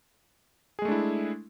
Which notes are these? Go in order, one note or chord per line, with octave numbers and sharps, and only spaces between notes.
G#3 A3 D4 E4 G#4